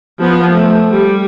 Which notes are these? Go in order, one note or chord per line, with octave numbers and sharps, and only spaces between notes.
F3 B3
A3
G3